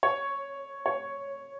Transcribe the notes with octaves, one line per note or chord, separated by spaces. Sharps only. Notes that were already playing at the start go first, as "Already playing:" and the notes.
C#5
C#5